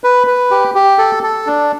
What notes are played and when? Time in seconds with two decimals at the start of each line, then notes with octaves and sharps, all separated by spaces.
0.04 B4
0.27 B4
0.51 G4
0.75 G4
0.98 A4
1.23 A4
1.47 D4